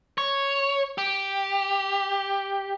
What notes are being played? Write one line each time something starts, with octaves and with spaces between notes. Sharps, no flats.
C#5
G4